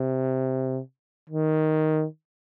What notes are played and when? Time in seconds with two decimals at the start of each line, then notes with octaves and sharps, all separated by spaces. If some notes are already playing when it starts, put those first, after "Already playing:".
Already playing: C3
1.29 D#3